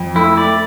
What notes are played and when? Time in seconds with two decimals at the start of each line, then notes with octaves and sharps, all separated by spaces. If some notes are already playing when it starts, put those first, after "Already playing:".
Already playing: F2
0.15 A3 E4
0.37 D5
0.46 A3